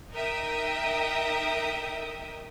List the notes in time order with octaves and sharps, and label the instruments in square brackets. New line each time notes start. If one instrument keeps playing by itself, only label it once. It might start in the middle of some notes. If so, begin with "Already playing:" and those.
[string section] D#4 A#4 E5 G5 D#6